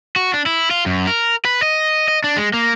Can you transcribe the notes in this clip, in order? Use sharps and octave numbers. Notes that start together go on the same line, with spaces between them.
F#4
D4
E4
F4
F#2
A#4
B4
D#5
D#5
D4
G#3
A#3